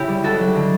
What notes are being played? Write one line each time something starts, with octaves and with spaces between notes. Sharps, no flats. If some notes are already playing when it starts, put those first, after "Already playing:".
Already playing: C#3 E4 G4
G3
C#2 F#4 A4
F#3
D3